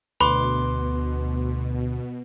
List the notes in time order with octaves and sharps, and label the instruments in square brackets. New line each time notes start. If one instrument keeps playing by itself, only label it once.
[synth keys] D2 [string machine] B2 [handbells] B4 C6 D6 [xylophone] B5